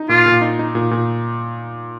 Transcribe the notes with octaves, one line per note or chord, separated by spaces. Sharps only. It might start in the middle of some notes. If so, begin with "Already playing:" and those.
Already playing: D#4
A#2 F4
A#2
D#4
D#4
A#2
A#2